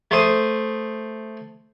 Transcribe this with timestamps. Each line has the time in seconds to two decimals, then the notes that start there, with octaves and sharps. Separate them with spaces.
0.11 A3 C5 D#6